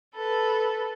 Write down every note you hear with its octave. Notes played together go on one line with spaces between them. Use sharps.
A4 B4